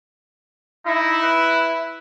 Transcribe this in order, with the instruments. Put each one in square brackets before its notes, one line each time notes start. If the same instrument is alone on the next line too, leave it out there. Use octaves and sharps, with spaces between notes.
[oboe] D#4 [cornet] E4
[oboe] B4